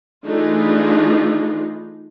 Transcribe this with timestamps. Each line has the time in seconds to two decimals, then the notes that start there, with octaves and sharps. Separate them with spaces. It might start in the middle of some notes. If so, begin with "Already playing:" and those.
0.25 E3 A3 D4 D#4 F4 G#4